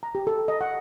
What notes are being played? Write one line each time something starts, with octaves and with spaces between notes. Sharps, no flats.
A#5
G4
A4
D#5
F#5